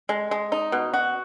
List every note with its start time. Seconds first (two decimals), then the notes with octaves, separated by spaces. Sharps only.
0.09 G#3
0.31 G#3
0.52 D#4
0.72 B2
0.94 F#4